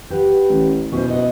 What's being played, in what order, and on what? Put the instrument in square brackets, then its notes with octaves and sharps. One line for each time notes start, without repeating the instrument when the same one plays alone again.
[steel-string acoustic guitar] G4 B4 F#5
[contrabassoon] A1
[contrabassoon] B2 [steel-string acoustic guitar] C#4 E4 C5
[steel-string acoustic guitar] D#5 F#5